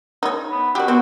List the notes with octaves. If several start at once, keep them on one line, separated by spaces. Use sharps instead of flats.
D#4 C#5
B3
F#4 G4 D5
B3 C4 F#4